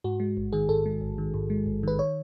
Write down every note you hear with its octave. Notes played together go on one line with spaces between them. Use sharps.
G#2 F#4
G#3
A1
D#3 G#4
G#2 A4
G#3
A1
D#3
G#2
G#3
A1
D#3 B4
D#3 C#5